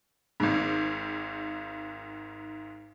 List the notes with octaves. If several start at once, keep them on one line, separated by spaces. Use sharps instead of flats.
G#1 G#2